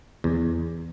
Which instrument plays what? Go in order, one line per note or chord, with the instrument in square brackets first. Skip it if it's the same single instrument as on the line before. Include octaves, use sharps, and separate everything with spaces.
[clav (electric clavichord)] E2